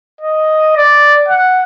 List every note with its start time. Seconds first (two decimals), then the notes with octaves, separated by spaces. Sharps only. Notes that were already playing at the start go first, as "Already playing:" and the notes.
0.21 D#5
0.77 D5
1.28 F#5